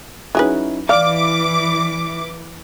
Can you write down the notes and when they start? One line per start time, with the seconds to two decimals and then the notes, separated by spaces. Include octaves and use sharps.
0.35 F#3 C#4 D#4 E4 G#4 B4
0.89 E3 D5 F5 D6 F6